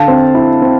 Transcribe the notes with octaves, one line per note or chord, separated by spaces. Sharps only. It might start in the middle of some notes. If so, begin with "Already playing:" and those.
Already playing: D3 F5 A5
C4
E4
C4